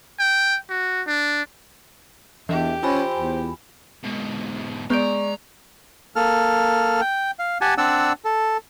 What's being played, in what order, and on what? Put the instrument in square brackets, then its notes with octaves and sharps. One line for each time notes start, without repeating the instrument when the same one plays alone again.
[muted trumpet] G5
F#4
D4
[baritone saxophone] E2 [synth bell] E3 [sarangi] G4 [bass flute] E5
[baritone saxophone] C#4 [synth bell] F4 G#5 B5 [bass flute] C5
[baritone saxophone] E2
[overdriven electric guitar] G#2 B2
[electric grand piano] G#3 [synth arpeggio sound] B3 G6 D7 [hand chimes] D5 C#6 [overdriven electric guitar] A#5
[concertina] A#3 A4 F6
G5
F5
G4 F#5 G#5 A5
C4 D4 D5 F#5 E6
A4